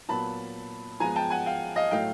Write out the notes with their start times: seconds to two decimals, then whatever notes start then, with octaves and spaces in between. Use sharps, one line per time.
0.09 A#2 F#3 B3 A5 B5
1.00 F3 G#3 B3 G#5 A#5
1.16 G5 A5
1.30 F#5 G#5
1.46 F5 G5
1.76 D#5 F5
1.91 A2 F#3 A3 F5 G5